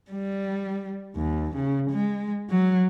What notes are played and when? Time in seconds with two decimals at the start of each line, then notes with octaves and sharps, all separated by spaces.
0.11 G3
1.16 D#2
1.56 C#3
1.91 G#3
2.50 F#3